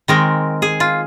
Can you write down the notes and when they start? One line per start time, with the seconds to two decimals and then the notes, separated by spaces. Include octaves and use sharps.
0.08 D#3 G#3 C4 A#4
0.62 G#4
0.80 F4